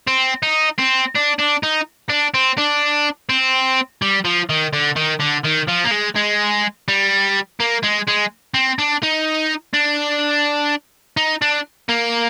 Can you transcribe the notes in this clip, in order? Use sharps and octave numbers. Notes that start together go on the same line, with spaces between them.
C4
D#4
C4
D4
D4
D#4
D4
C4
D4
C4
G3
F3
D#3
D3
D#3
D3
D#3
F3
A#3
G#3
G#3
G3
A#3
G#3
G#3
C4
D4
D#4
D4
D#4
D4
A#3